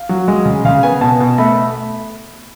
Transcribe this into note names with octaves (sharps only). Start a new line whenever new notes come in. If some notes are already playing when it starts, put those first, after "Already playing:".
Already playing: F5
F#3
G#3
C#3
C#3 F5
B3 G#5
B2 A5
B2
A3 B5